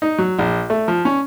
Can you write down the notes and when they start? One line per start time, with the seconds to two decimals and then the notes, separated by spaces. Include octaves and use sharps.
0.02 D#4
0.18 F#3
0.39 A#1
0.70 A3
0.88 F3
1.05 C#4